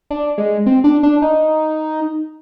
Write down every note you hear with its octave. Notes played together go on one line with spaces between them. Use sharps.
D4
G#3
C4
D4
D4
D#4